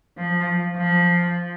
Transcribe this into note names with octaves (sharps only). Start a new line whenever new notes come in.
F3
F3